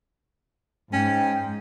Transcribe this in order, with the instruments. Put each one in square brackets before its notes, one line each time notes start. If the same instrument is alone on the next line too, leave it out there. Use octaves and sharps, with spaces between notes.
[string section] G#2 [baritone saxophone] C#4 [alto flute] G5